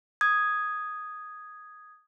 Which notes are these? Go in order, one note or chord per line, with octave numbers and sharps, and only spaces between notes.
D#6 G#6